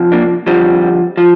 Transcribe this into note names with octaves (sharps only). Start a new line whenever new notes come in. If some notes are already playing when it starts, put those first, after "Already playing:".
Already playing: F2 C3 F3
A#3 D4
F2 D3 F3 G3 C4
F3